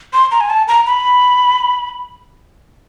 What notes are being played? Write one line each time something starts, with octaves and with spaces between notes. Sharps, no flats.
C6
A#5
G#5
A5
A#5
B5